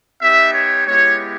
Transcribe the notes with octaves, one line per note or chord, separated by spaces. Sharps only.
B3 D#4 G4 E5
C#5
G#3 B3 E4 G4 C#5